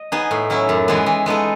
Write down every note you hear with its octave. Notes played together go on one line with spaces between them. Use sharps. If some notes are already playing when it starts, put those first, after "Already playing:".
Already playing: D#5
B3 D#4 G#4
A2
F#3 C#4 E4
F#2
E3 G#3 B3
E3
G#3 B3 D#4 A4